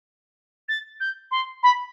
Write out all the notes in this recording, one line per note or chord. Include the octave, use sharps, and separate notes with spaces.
A6
G6
C6
B5